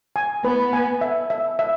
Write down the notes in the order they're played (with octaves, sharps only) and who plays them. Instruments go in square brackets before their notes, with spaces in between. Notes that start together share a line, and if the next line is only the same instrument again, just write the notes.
[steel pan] G#5
[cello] B3 [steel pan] B4
[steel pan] G#5
E5
E5
E5